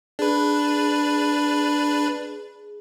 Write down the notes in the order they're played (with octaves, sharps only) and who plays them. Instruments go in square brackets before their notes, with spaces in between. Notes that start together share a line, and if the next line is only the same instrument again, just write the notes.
[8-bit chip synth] D4 B4 [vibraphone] G#4